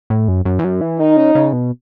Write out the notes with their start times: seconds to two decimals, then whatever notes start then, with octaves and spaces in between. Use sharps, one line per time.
0.10 A2
0.28 F#2
0.45 F#2
0.59 E2
0.64 F#2
0.81 E3
0.99 D#3 D#4
1.17 C#3
1.35 C#3
1.53 B2